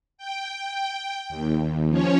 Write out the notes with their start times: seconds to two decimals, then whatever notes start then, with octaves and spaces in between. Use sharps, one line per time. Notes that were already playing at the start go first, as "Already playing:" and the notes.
0.18 G5
1.29 D#2
1.89 F3 C#4 C#5